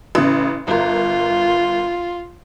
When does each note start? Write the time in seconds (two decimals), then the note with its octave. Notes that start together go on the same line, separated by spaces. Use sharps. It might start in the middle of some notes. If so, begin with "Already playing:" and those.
0.15 A1 C#3
0.68 G1 F4 A#4